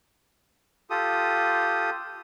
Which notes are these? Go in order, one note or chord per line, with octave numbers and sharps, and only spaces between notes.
F4 G4 A4 D#6